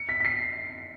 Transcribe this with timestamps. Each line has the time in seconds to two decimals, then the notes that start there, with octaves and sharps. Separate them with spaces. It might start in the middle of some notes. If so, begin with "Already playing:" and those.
Already playing: C#7
0.09 B6
0.20 B6
0.25 C7